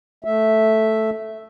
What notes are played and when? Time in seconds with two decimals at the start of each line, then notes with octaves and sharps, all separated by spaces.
0.25 A3 E5